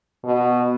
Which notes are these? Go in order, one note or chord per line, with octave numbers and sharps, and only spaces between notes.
B2